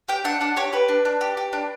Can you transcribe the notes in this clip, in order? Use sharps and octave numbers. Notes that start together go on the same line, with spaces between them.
G4 G5
D4 F#5
D4 F#5
G4 C#5
G4 B4
D4
D4
G4
G4
D4